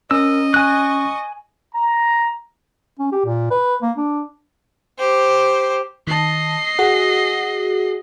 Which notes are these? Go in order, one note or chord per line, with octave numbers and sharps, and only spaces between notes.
C#4 A#4 D#5 E6
G#5 C#6 F#6
A#5
C#4
G4
A#2
B4
A#3
D4
G4 C5
D#3 D#5 A5 C7
F#4 G#4 F#5